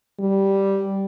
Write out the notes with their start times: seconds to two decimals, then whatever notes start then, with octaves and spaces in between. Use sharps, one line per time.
0.20 G3